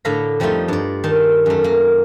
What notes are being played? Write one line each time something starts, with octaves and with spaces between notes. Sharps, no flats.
A2 D3 A4 F5 A#5 B5
F2 F3 G3 A3 D#4 F4
G2 D5
D#3 D#4 A5
F#2 A3
A#3